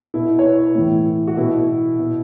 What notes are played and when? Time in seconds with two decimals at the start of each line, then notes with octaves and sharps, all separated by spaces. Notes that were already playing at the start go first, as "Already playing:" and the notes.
0.14 B2 E4
0.39 C#5
0.45 B4
0.75 A2 E3
1.27 F#4
1.37 B2 E4
1.99 B2